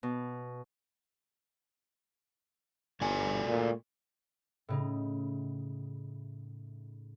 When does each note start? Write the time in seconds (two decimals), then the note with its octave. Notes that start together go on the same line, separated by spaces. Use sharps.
0.03 B2
3.01 G1 A3 D5 G#5
3.48 A#2
4.68 A2 C#3 D#4